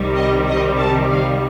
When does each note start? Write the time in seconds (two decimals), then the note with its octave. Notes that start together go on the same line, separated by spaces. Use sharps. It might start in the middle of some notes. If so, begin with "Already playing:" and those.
Already playing: C2 C3 D#3 G3
0.16 D#5
0.47 D#5
0.78 A5
1.10 F5